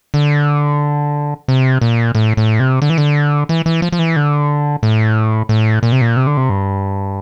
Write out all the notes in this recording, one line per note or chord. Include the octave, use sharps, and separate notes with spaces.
D3
C3
A#2
A2
A2
C3
D3
E3
D3
E3
E3
F3
F3
E3
D3
A2
A2
A#2
C3
A#2
C3
D3
C3
G2